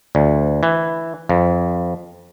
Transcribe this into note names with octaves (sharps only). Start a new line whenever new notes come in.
D2
E3
F2